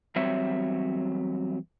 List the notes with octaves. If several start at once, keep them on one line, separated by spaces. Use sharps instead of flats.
E2 F#3 G3 C4 C#5 E5